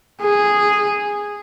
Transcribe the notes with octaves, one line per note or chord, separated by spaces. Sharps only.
G#4